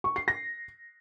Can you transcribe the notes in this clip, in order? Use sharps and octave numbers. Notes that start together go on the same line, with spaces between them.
C#6
C7
A#6